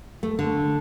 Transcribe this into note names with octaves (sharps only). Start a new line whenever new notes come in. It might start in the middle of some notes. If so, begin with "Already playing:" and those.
A3
D3